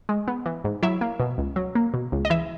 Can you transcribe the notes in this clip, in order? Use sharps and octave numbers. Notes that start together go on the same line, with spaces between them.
G#3
B3
E3
G#2
F#3 E4 E5
A#3
B2
C#2
F#3
A#3
B2
C#2
D#5
E3 E4 E5